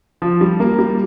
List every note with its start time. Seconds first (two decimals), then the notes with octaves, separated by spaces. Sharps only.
0.22 F3
0.41 G3
0.60 A#3
0.78 G3